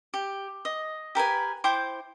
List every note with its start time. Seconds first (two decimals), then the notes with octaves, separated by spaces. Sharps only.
0.14 G4
0.65 D#5
1.15 G4 A#4 B4 G#5
1.64 E4 C5 G5 D6